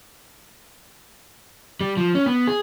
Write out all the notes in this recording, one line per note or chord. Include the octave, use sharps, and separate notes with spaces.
G3
F3
C#4
B3
G#4